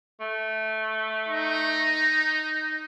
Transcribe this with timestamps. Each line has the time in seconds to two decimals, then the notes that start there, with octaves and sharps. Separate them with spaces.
0.20 A3
1.27 D#4